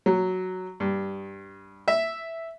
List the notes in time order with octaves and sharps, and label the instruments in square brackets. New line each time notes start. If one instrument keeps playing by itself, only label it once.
[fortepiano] F#3
G2
E5